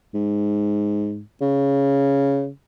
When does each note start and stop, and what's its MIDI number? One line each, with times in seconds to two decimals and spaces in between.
0.14 1.22 44
1.41 2.50 49